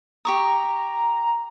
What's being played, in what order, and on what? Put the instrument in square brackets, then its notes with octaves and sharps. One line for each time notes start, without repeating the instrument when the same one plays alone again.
[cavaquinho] G4 C#6 D#6 [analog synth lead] A#5